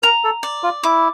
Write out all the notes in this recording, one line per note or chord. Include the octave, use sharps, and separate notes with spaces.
A#4 A#5
A4
D5
F4
E4 D6